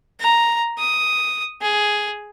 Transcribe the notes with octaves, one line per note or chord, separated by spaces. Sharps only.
A#5
D#6
G#4